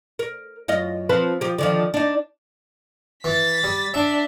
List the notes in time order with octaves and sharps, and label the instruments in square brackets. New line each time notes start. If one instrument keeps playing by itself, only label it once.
[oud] A#4
F#2 F4 D#5
F3 C4 B4
F3 G4
D3 D#3 F3
D4 D#4
[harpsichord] E3 [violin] A6 B6
[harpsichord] G3
[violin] D4 [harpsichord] E5